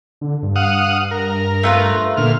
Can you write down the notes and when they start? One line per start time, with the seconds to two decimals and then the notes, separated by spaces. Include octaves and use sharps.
0.21 D3
0.43 G2
0.56 F5 F#5 D#6
1.11 A#4
1.63 A3 F4 B4
2.17 A#2 D3 F6